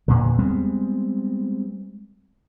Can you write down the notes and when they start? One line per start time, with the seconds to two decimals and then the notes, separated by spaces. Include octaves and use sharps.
0.08 E2 A#2 D3
0.39 G3 G#3 B3 C4